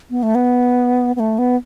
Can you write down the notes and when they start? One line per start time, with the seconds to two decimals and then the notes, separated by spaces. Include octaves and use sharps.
0.10 B3
0.23 A3
0.35 B3
1.16 B3
1.20 A3
1.38 B3